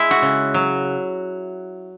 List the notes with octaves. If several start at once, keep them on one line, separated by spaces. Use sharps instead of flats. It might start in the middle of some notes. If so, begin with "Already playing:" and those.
Already playing: G#3 E4 E5
F#4 F#5
C#3
F#3